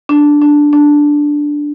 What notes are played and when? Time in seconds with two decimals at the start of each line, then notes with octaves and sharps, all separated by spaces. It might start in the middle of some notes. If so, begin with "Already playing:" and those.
0.09 D4
0.42 D4
0.73 D4